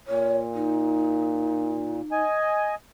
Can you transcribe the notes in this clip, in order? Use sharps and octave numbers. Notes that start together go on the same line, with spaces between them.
A#2 C#5
D#4
D#5 G#5